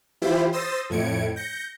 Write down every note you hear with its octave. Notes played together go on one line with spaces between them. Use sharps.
E3 E4 F4 G4 C5 B5
C5 C6 D#6 E6 A6 A#6
F2 A2 G#6 C#7 D7
G6 A#6 C#7